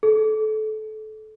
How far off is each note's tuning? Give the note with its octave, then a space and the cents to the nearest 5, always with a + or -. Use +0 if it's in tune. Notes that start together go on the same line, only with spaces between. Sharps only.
A4 -25